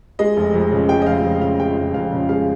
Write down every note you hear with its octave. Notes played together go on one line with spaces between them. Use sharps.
G#3 D#5
F1
F2
C#3
G#3 G5
D#5
F1 F5
F2
C#3 F5
G#3 G5
F1
F2 F5
C#3
G#3 F5